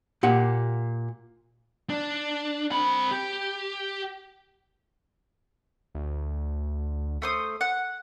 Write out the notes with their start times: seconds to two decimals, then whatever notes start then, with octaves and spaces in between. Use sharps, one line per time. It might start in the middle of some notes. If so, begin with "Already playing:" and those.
0.23 A#2 G4 F#5
1.90 D4
2.71 C4 B5
3.11 G4
5.95 D2
7.22 A3 C5 D#6
7.61 F#5